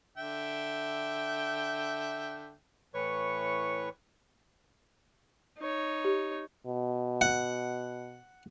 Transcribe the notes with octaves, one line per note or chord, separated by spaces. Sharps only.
D3 E5 G5
A2 E3 B4 C#5 C#6
D#4 C#5
G4
B2
F#5